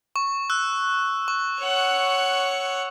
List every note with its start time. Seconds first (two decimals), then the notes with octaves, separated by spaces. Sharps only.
0.16 C#6
0.50 E6 F#6
1.28 C#6
1.60 C#5 F#5